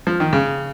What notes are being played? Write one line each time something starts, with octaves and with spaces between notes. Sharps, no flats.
F3
D#3
C#3